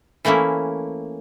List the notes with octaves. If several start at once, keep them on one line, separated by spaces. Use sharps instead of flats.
E3 A3 A#3 C#4 E4